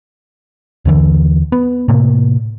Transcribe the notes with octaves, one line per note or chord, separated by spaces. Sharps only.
D#2 D3 E3
B3
A2 C3 A#3